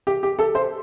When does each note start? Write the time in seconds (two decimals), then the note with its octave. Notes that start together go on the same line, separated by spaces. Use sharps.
0.07 G4
0.23 G4
0.39 A4
0.55 C5